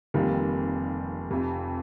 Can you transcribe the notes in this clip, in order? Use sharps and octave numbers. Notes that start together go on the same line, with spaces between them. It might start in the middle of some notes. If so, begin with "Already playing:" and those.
F1 F2 D#3 G3 A#3
F1 F2 C3